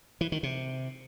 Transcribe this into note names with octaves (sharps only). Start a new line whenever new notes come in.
E3
D#3
C3